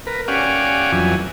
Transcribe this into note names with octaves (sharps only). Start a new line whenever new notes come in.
A#4 B4
C#4 G4 D5 F5 F#5 G#5
F2 E3 F#3 G#5